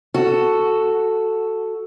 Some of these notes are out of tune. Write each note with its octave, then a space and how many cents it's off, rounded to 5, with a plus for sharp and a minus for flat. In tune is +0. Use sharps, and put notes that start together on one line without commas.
F#4 +0 A4 +0